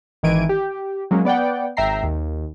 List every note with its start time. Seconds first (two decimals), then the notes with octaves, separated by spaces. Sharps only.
0.23 G#1 D#3 E3 G#6 D7 D#7
0.49 G4
1.11 F#3 G#3 A#3 C#4
1.25 B3 D5 F#5 G5
1.77 G#1 E5 G5 A#5 C7
2.03 D#2